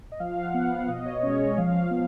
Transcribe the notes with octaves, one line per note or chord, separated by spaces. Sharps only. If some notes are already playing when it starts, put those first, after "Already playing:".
D#5
F3 F5
F#5
B3
F5
B2 D#5
C#5
G#3 C#4 C#5
D#5
F3 F5
B3